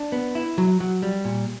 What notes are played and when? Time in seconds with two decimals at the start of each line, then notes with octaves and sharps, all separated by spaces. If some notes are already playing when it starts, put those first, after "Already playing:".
Already playing: D4
0.12 B3
0.35 E4
0.58 F#3
0.80 F#3
1.02 G3
1.25 A#2